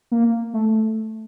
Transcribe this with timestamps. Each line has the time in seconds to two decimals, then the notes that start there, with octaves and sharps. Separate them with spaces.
0.11 A#3
0.53 A3